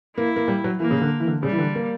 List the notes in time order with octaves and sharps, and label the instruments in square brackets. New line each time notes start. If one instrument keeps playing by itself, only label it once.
[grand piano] A#3 [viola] E4
[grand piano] A#3
G3
F#3
[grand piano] E3 [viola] A#3
[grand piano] C#3
D3
E3
D3
[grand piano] C#3 [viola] G3
[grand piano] E3
D3
A#3